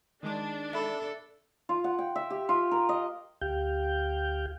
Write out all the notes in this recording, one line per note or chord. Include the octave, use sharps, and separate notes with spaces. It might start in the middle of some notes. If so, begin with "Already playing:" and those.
D#3 G#3 D4 D6
A4 E5 B5
F4
F#5
G5
E5
G4
F4
A#4
D#5
D2 G4 F5 G5 G6